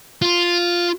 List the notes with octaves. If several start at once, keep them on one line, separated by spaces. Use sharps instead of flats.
F4